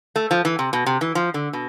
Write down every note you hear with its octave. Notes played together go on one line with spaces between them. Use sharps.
A3
F3
E3
C3
B2
C3
E3
F3
D3
B2